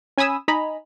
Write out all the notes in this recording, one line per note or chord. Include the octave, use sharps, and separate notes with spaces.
C#4 G#5 B5 D#6 E6
D#4 D#5 G#5 A#5 B5